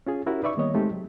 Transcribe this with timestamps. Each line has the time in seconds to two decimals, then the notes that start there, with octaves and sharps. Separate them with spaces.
0.07 C#4 F4 G#4
0.26 C#4 E4 F#4 G4 A#4
0.43 D#4 B4 D5 E5 C#6
0.57 D#3 G3 A#3 B3 C#5 D#5
0.74 G#3 A3 C4 D#4 G4 A4
0.91 F#3